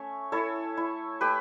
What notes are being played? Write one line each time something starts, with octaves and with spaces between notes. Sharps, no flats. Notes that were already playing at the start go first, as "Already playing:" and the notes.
Already playing: A3 C#4 C#5 E5
E4 A4 C#5
E4
A3 G4 B4